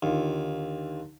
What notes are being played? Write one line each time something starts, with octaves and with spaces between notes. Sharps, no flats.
D#2 D3 D#3 F4